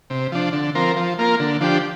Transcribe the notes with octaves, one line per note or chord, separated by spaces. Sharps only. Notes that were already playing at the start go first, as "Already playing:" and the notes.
C3
F3 D4
D3
F3 C4 A#4
F3
A#3 F4 A#4
D3
F3 D4 G4